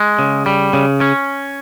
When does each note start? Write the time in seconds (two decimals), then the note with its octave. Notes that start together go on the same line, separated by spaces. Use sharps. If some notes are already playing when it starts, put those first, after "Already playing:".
Already playing: G#3
0.19 C#3
0.46 G3
0.73 C#3
1.01 C#4